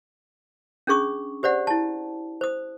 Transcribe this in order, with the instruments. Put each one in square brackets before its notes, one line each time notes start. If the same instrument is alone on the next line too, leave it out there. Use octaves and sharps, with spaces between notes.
[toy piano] C#4 D4 G#4 C#6 D#6
G4 C5 D5 F#5
E4 A5
C5 D#6